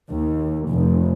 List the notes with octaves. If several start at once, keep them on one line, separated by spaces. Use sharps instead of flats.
D#2
F1